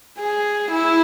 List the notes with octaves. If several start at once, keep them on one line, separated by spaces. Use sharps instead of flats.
G#4
E4